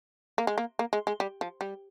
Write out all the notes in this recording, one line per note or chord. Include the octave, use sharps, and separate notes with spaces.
A#3
G#3
A#3
A#3
G#3
G#3
G3
F3
G3